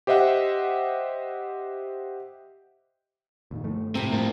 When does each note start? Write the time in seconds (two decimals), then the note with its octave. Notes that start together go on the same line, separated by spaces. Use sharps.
0.07 G4 C5 D#5 E5 F#5
3.51 D2 A#2 D#3
3.64 G2 F3 A3
3.95 A2 C3 C4
4.12 G2 F3 A#3